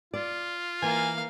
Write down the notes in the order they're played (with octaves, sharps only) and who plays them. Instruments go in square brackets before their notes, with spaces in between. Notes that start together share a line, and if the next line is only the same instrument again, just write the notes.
[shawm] F4 [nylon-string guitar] D5
[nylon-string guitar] E3 [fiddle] A#3 F5 [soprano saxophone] G#5